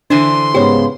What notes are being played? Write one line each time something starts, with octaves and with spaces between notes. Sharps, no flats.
D3 E3 D4 C5 C6
G#2 C#3 B3 G4 C5 C#5